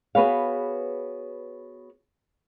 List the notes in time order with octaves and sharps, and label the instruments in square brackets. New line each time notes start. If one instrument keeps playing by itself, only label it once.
[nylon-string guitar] B3 F#4 G#4 B4 C#5 F5